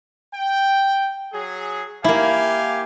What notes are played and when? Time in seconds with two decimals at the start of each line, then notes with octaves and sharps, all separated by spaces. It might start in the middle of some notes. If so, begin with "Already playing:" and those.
0.34 G5
1.33 F#3 G#4
2.04 A#3 E4 G4 F5 G#5